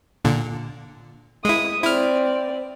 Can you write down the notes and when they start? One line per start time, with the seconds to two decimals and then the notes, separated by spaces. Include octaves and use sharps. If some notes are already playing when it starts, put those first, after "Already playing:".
0.24 A#2 D3
1.45 G#3 E4 D#6
1.84 C4 E4 D5 F6